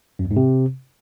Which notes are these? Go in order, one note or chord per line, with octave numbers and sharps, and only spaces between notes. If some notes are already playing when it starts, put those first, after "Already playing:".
F#2
E2
G#2
C3